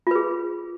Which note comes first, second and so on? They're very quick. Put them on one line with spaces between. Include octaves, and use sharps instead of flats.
F4 B4 G#4